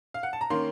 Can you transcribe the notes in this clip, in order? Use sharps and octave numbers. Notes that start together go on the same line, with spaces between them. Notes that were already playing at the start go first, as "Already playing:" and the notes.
F5
F#5
A5
A#5
D#3 A#3 C#4 C6